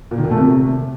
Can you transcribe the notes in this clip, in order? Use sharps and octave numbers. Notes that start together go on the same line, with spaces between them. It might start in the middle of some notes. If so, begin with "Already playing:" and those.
A#2
D#3
A#2
A3
C3